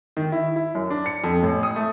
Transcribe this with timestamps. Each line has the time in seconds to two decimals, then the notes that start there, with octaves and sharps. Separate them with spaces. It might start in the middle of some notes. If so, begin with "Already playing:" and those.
0.17 D#3
0.32 E4
0.56 E4
0.75 F#2
0.90 D4
1.06 C#7
1.24 F2
1.43 A1
1.63 D#6
1.76 A3